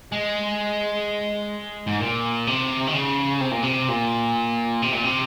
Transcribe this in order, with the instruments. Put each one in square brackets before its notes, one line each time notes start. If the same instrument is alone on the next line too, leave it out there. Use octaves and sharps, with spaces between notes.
[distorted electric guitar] G#3
G#2
A#2
C3
D#3
C#3
C3
A#2
C3
A#2
C3
A#2
C3